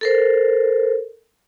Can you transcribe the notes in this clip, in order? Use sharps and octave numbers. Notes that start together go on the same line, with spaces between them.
A4 A#4 C5